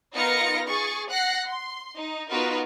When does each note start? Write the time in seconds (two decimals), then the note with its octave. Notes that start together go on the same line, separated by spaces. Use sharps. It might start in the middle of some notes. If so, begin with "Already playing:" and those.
0.13 B3 D#4 F4 A#4 A#6 C#7
0.66 G#4 C#6 A6
1.10 F#5 F#6 A#6 C7
1.47 C6
1.98 D#4
2.29 B3 D#4 F4 F#4 A#4 B4